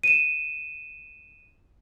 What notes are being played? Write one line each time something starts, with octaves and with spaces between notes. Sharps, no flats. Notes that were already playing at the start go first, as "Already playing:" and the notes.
D#7 E7